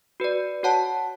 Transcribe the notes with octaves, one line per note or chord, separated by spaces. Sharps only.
F#4 B4 D5
F#4 C#5 F#5 A5